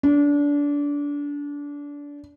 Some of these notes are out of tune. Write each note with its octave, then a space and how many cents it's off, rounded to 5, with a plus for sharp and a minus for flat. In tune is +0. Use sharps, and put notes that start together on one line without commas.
D4 -25